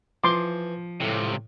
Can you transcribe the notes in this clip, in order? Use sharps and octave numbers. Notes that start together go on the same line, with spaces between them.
E3 F3 C6 D6
C#2 A2 C3